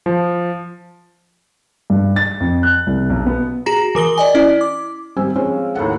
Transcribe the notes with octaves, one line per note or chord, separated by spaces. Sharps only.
F3
G2
A6
F2
F#6
C2
B1
B3
F#4 G#4 A#5 A#6
E3 A#4 D#6 G7
D5 D#5 G#5
C#4 E4 D5
D6
G#1 G3 C4 G4 G#5 E6
F3 G#3 C4 C#4 F5
D#2 A2 A4 F#5